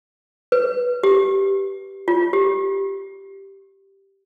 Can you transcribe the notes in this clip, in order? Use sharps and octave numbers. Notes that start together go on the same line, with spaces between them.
B4
G4
F4
G4